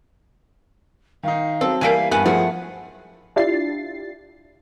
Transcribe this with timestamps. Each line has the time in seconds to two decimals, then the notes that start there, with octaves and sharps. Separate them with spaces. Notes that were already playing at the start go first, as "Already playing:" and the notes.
1.23 D#3 D#4 F5
1.61 F#3 C4 A4
1.81 E3 G3 A#3 F5 G#5 B6 D7
2.11 G2 B3 F#5 G#5 A5
2.26 F3 A3 G#4 F#5
3.36 D4 E4 F4 G4 A6 C7